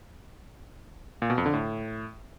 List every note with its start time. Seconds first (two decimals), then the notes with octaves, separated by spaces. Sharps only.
1.22 A#2
1.30 B2
1.38 F2
1.46 D3
1.54 A2